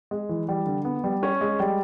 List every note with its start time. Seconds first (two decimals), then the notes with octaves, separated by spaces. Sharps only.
0.11 G#3
0.29 E3
0.48 G3
0.66 D3
0.85 B3
1.04 G3
1.23 C#4
1.41 G#3
1.60 G3